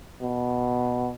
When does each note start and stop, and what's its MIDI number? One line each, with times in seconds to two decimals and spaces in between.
0.21 1.11 47